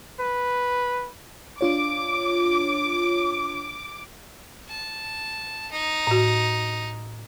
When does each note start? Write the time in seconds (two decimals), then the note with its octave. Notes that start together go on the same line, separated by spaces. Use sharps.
0.20 B4
1.61 D4 F4 C#5 D6
4.69 A5
5.72 D#4
6.07 A2 F#4